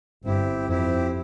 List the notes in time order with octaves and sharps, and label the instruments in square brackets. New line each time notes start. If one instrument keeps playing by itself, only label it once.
[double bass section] G1 G2 [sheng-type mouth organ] C4 E4 G4
[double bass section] F2 [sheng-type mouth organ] C4 E4 G4